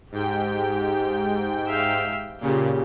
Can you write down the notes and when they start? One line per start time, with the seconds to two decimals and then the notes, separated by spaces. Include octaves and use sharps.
0.12 G#2 G4 G5
1.67 E5 F5
2.41 A#2 C#3 G4